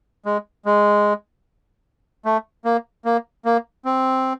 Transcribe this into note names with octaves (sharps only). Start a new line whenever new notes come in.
G#3
G#3
A3
A#3
A#3
A#3
C4